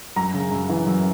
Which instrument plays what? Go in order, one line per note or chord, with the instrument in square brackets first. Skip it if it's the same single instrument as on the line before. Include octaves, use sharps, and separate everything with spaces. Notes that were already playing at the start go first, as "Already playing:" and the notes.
[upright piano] F#2 A#5
C#3
F#2
E3
F#2